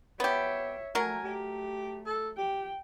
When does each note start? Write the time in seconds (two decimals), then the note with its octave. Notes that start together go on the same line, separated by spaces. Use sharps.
0.20 B3 G4 C#5 E5
0.95 F#3 A3 A#4 G#5
1.25 A3 G4
2.06 A4
2.38 G4 G5